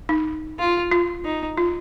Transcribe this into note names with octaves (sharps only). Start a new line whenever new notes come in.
D#4
F4
F4
D#4
F4